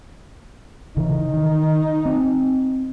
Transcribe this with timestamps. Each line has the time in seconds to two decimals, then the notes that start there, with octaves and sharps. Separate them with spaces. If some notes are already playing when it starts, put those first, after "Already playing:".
0.97 C#3 E3 D#4
1.34 D#3
2.05 C4